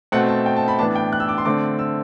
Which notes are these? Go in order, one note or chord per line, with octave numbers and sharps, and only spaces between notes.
B2 A3 C4 F#5
A5
G5
A5
B5
A2 E3 B3 D4 A5
G5
F#6
E6
D6
C6
D3 A3 C4 D6
E6